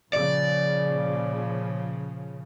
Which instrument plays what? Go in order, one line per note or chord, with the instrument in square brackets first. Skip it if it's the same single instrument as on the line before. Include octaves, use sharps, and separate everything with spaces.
[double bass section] A#2 C#3 F3 [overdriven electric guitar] D5